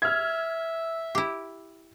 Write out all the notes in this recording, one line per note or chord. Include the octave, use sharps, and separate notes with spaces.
E5 F6 G#6
E4 G4